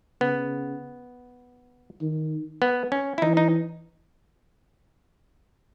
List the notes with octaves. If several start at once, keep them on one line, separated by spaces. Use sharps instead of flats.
C#3 B3
D#3
B3
C#4
E4
E3 D#4
D#4